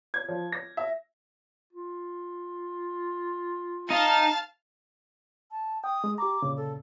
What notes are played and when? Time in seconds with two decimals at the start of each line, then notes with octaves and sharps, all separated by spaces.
0.14 G#6
0.28 F3
0.52 A#6
0.77 E5
1.73 F4
3.90 D#4 F5 A5
5.51 A5
5.84 G5 D#6
6.04 G#3
6.18 G4 A#5 D6
6.42 D2 A#2 C#3
6.57 A4